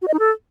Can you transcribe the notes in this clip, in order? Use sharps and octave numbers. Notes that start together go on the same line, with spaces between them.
F#4
D#5
D#4
A4